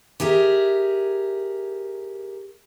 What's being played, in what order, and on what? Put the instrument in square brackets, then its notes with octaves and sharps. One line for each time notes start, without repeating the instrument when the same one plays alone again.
[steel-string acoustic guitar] G4 G#4 A#4 E5